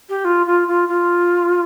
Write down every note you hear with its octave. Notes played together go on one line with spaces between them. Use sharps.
G4
F4
F4
F4
F4